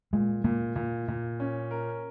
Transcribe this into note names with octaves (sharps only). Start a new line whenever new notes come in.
A#2 G#3
A#2 A#3
A#2
A#2
C#4
A#4